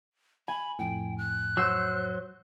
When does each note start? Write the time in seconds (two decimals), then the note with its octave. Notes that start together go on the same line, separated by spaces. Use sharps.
0.48 G#5 B5
0.79 F2 A2 G5
1.18 F#6
1.57 F#3 C5 E6 G6 C7